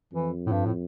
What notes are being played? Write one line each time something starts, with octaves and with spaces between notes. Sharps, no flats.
F2 E3
A2
G2
A2